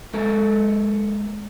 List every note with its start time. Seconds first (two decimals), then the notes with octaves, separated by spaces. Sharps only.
0.14 G#3 A#3 A4 A#4